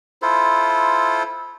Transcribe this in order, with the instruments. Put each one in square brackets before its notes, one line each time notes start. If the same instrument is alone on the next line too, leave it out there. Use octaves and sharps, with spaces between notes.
[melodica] E4 F4 A4 C5